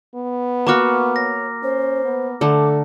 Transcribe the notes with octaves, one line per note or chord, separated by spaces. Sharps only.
B3
A#3 F#4 F5 A#5 C#6 D6 F6
C#5 A#6
C#4 C5
B3
D3 A3 A4 D6